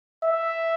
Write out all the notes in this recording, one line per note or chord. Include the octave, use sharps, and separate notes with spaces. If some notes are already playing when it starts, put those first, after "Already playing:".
E5